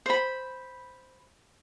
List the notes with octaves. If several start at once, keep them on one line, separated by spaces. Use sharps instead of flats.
C5 B5